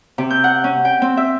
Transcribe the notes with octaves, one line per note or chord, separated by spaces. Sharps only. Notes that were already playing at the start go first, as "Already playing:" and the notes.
C3
G6
F#5
C#4
G5
C4
E5